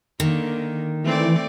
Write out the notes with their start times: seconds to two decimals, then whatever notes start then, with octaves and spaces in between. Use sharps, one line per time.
0.20 D3 D#3 A#3
1.04 E3 A3 C4 D5